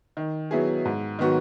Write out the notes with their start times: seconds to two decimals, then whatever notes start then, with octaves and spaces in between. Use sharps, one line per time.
0.17 D#3
0.51 F#3 B3 E4 G#4
0.85 G#2
1.19 D#3 F#3 B3 F#4